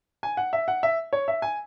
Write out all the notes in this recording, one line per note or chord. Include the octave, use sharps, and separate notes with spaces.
G#5
F#5
E5
F#5
E5
C#5
E5
G#5